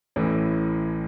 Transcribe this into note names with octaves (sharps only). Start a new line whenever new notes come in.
A1 A2 E3